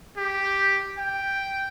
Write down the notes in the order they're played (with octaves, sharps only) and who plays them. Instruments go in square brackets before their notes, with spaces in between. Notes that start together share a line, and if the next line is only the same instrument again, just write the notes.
[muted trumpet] G4
G5